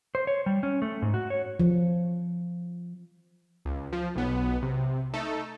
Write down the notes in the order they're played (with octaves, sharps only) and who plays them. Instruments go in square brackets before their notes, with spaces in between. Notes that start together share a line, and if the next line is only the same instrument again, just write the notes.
[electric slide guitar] C5
C#5
G3
C#4
A3
G#2
F#4
C#5
[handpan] F3
[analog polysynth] C#2
F3
B1 B3
C3
A3 D#4 A4